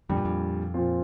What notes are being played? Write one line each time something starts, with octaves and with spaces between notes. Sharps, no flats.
F2 A#2 G3 D4 G4
G2
F2
A#2 F3 C4 F4